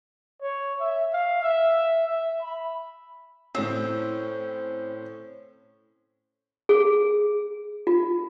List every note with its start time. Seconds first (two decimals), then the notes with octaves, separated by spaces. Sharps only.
0.42 C#5
0.80 E5
1.13 F5
1.43 E5
2.05 E5
2.42 B5
3.55 A2 C4 C#4
6.69 G#4
7.87 F4